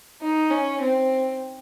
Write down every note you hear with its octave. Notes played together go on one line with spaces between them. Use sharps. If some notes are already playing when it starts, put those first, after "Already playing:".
D#4
C#4
C4